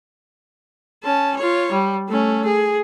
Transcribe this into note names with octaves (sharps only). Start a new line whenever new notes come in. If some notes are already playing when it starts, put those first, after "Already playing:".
C#4 A5
F4 C#5
G3
A3 C#4
G#4